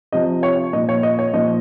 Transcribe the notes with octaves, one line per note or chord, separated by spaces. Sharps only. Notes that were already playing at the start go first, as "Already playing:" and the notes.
C3 F3 D#5
C#5
A#2 F3 D#5
C#5
D#5
C#5
A#2 F3 D#5